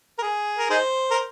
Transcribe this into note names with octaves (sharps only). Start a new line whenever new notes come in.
A#4
G#4
A#4
D#4 G#4 C5
A#4